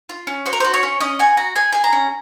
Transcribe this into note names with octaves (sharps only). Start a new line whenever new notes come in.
F4
C#4
F#4 C5
A#4
F#4 C5
C#5
C#4
C#4 D#5
F#4 G#5
F#4 A#5
G#4 G#5
G#4 G#5
A#5
C#4